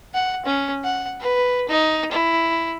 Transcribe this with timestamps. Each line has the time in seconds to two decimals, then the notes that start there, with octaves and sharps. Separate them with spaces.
0.14 F#5
0.46 C#4
0.84 F#5
1.21 B4
1.68 D#4
2.11 E4